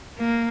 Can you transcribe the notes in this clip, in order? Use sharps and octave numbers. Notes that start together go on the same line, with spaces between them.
A#3